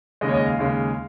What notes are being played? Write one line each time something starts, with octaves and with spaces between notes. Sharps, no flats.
D#2 C#3 G#3 D#5
C#5
D#5
F5
D#2 C#3 G#3